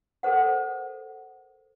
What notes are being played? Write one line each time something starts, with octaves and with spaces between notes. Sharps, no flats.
A4 A#4 C5 F#5